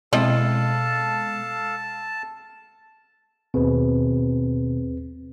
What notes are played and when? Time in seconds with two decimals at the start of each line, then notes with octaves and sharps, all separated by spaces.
0.13 B2 G#3 C4 E4 A4 D#5 F5 A5
3.54 D#2 B2 C4 G#4 B4